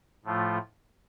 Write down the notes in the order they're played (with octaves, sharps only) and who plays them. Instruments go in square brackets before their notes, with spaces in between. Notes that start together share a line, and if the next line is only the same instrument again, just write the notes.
[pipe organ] A2 F3 A3 F4